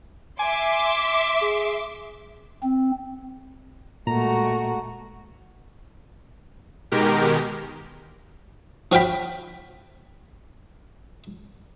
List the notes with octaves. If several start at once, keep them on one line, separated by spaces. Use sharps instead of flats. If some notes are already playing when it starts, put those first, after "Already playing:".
E5 G#5 C6 D6
G#4
C4
A#2 G#3 A3 F#4 A#5
B2 D#3 G#3 G4 A#4
F3 F#4 F5 G5 B5